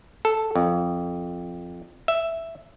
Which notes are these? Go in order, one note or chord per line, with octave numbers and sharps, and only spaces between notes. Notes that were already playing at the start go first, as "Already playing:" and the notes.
A4
F2
E5